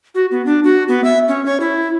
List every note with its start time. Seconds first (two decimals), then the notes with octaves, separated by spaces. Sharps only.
0.15 F#4
0.31 B3
0.46 D4
0.64 F#4
0.88 B3
1.04 E5
1.28 C#4
1.46 C#5
1.60 E4